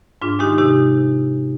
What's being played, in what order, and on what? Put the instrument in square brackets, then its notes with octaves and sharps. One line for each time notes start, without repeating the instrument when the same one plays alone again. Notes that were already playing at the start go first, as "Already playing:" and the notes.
[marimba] G#2 D4 F4
D#3 G#3 D#4 G4
C3 D#4 G4